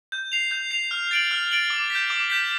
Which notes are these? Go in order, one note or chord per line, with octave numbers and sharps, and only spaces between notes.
G6
C7 F7
G6
C7 F7
F6
A6 D7 F#7
F6
A6 D7 F#7
D6
G6 B6
D6
G6 B6